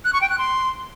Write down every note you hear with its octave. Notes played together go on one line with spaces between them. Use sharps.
F#6
C#6
G5
F#6
C6